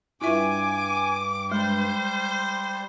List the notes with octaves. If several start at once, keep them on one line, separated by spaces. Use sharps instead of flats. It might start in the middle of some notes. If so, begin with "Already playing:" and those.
G2 E4 F4 E5 G#5 D6
G3 G#3 C5